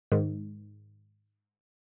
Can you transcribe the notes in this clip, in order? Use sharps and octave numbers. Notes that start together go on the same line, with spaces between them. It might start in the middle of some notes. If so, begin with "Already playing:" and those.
G#2 D#3